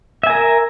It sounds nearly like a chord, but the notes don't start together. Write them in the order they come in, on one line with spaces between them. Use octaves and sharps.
E5 G#5 A#4